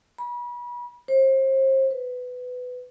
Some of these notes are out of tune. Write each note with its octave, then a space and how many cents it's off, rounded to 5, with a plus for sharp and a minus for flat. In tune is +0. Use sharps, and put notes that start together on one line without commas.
B5 -35
C5 +35
B4 +15